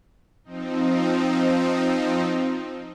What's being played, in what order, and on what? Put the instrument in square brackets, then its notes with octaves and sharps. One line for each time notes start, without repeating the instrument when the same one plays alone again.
[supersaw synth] F3 C4 D#4